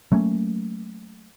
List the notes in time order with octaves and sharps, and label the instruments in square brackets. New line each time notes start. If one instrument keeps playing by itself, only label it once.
[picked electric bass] F#3 A3 A#3 C#4